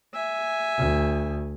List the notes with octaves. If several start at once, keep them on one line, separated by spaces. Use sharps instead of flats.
E5 G#5
D2